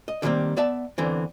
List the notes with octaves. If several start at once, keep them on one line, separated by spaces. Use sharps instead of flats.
D#5
D3 D#3 F#3 G3 A#3 C4
B3 D5 E5 A5
E2 D3 E3 C4